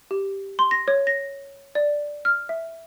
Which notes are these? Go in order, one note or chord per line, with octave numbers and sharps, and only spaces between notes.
G4
C6
A#6
C#5
A#6
D5
F6
E5